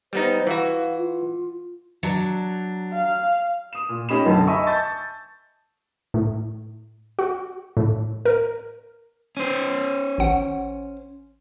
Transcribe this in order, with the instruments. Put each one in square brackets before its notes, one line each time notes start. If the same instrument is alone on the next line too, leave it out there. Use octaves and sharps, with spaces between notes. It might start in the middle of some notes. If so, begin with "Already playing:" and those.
[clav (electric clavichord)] G3 B3 D#4 [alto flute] C5
[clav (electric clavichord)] E3 F#4 [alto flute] F5
[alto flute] F4
[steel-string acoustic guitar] F#3 D4
[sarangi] F5
[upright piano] D#6 E7
A#2
C#4 D#4 G4 B5 E7
B1 F#2 D3 A5
D#5 E5 G#5 B5 C#6 E6
A5 C#6 G6 A6
[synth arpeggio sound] A2
F#4
A2
A#4
[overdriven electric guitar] C#4 C5
[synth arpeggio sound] A1 F#5